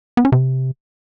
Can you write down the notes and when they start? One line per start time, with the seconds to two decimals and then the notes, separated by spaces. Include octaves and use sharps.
0.17 B3
0.25 C#4
0.32 C3